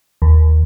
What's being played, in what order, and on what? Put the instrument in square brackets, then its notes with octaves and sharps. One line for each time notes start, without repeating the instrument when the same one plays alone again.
[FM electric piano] D#2